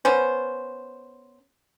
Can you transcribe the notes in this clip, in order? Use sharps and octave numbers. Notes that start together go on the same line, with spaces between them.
B3 C#4 C5